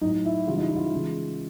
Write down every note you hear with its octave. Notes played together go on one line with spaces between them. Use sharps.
A2 F#3 D#4
E4
C#3 E3 G3 F4
D#4
E4
E4
F4
C#3 E3 G#3